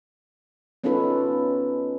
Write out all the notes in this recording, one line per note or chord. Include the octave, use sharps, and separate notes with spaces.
B3 C#4 D#4 F4 A4 B4